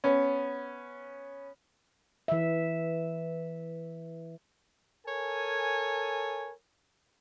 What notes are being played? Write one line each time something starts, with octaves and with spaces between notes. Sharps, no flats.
B3 C#4
E3 E5
A4 A#4 C#5 G#5